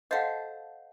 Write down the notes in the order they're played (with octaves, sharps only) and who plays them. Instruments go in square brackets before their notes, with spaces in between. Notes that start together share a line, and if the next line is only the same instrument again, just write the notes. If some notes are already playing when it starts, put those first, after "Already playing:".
[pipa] A4 C5 [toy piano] D#5 F5 F#5